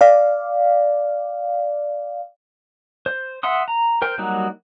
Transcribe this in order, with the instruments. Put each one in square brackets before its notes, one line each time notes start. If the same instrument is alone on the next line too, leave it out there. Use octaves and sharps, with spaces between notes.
[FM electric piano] D5 F5
[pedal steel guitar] C5
E5 F#5 C6 D#6
A#5
A#4 C5 G5
F#3 G3 A#3 D#4 F#4